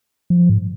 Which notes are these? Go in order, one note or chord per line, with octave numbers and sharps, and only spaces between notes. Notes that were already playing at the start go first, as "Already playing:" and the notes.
F3
G#2